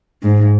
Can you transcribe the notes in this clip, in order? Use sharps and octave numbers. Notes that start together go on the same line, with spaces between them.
G#2